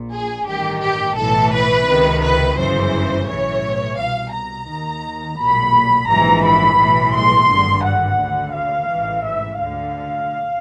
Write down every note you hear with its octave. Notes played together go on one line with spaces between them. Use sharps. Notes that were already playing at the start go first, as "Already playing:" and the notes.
Already playing: A#1 A#2
G#4
A1 G2 D#3 G4
G4
B1 A2 E3 A4
B4
C#2 C3 D#3
B4
G1 F#2 C#3 E3 C5
B1 A2 E3 C#5
C2 B2 F5
A#5
D#2 D#3
B1 A#2 B5
A#1 G#2 E3 A#5
B5
B1 A2 E3
C6
G#1 G2 D3
F#5
D2 D3
F5
A1 G#2 E3
E5
D2 D3 F5